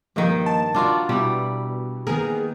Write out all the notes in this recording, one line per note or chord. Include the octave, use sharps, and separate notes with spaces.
G2 D#3 F3 A#3 D#5
A5
D4 F4 F#4 D5 A#5
B2 G3 E4
D#3 A#3 B3 G#4 A#4